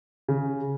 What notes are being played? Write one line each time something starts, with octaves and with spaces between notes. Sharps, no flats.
C#3